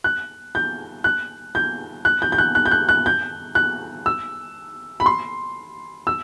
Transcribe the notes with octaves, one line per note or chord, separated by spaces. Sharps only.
F#6
G6
F#6
G6
F#6
G6
G6
F#6
F#6
G6
F#6
F#6
G6
F#6
E6
B5
C6
E6